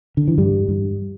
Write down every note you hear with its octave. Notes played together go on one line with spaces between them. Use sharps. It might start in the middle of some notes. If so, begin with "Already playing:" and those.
D3
E3
G2 G3
G2